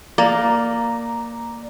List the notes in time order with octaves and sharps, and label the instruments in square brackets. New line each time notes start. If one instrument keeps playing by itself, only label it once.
[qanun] A#3 [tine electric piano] D5 A#5